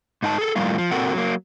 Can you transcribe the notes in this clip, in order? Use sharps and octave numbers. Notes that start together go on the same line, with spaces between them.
G#2 D#4 G4 A5
G#4 A4
F2 A2 G3 A#3 F4
F3
A#2 C4 F#4 A4 A#4 F#5
F#3 A#3